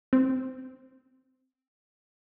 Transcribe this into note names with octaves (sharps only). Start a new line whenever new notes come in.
C4